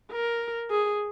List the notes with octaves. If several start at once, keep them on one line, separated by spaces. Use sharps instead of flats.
A#4
G#4